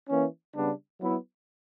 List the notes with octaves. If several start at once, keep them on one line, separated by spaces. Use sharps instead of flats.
E3 A#3 C#4
C#3 G3 B3 D4
F#3 B3 E4